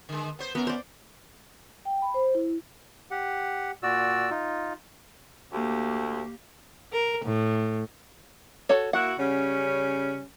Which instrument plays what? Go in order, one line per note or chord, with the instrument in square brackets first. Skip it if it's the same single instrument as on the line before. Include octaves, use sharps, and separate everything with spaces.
[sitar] D3 G#3
B3 C5
[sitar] F#2 A#4 [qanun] B3
[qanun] C5 D5
[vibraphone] G5
B5
C5
E4
[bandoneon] G4 F#5
A#2 F#4 D5 E6
D#4 F4
[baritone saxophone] D2 [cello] A#3 G4
[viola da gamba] A#4
A2
[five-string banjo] F#4 A4 C#5
[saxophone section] A#3 E4 F#4 [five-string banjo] F#5
[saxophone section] C#3 G3 C#4